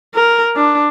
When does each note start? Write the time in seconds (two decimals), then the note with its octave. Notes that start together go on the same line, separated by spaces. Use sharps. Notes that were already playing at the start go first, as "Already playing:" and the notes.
0.15 A#4
0.56 D4